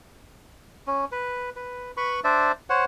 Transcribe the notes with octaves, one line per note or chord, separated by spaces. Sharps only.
C#4
B4
B4
B4 B5 C#6
D4 C5 D5 E5
C5 C#5 F#5